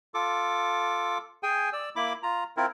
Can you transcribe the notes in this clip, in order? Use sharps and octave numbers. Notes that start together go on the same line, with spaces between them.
F4 A4 D6
G#4 G5 G#5
D5 E6
A#3 E4 B5 D6
F4 A#5
C4 E4 F4 A#4